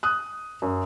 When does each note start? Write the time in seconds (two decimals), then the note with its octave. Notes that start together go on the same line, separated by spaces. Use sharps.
0.03 D#6 F#6
0.62 F#2